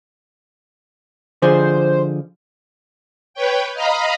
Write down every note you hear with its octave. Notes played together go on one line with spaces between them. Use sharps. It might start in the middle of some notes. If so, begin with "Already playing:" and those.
D3 F3 G#4 C5
B4 C#5 G5
D#5 F5 A#5 B5